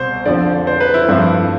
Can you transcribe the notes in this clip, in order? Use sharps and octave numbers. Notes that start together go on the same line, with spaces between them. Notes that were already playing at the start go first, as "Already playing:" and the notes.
Already playing: C2 B2 C5
F2 D3 F3 C4 D5
C5
B4
E4
G2 F3 A3 C4